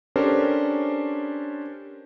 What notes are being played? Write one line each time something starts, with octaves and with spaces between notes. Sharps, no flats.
C#4 D4 G4 A4 A#4 C5